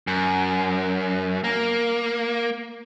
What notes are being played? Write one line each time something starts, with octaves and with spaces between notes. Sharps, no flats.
F#2
A#3